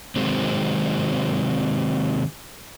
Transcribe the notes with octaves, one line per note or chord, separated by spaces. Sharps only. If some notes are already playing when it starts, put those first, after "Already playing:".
C3 D#3 F#3 G#3 C4